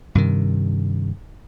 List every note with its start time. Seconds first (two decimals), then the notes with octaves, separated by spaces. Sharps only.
0.15 G2 C3 D#3